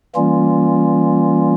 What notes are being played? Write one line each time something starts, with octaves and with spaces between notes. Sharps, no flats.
E3 G3 A#3 C#4 F4